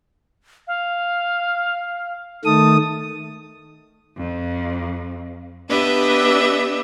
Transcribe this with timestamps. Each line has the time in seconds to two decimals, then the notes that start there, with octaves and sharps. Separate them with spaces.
0.67 F5
2.45 D#3 A3 A5 D#6
4.15 F2
5.68 B3 D4 G4 B4 D#5 E5